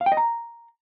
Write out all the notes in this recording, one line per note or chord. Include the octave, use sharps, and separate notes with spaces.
F5
G5
D#5
A#5